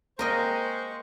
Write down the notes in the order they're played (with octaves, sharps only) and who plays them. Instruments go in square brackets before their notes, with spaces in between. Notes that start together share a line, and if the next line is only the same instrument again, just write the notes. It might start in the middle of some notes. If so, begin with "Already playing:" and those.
[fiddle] G#3 C#6 [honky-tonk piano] A#3 [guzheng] A#4 D#5 G5 [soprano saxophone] C5